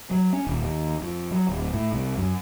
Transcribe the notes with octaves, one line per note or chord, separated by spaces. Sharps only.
F#3
C#4
D#1
D#2
F2
F#3
D1
A2
C2
F#2